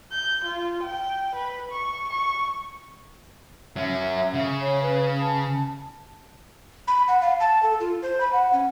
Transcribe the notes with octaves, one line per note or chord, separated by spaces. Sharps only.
G6
F4
G5
B4
C#6
C#6
F#3 C#4 E5
C#3
C#5
B4
A5
B5
F#5
F5
A5
A4
F4
C5
B5
F#5
C#4